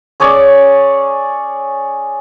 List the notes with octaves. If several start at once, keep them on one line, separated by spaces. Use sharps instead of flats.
C#4 G#4 C#5 D5